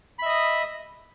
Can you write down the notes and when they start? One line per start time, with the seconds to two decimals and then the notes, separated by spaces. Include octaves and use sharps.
0.19 B5
0.22 E5
0.26 D#5
0.29 D#6